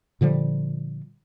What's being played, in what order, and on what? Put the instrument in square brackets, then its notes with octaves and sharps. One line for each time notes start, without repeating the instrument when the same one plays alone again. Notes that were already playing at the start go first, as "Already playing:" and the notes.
[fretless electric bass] A#2 D3 F3 G3